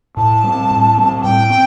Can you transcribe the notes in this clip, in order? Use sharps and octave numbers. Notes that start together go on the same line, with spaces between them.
A2 A5
G3 C4
A2
G3 C4
A2 G5
C4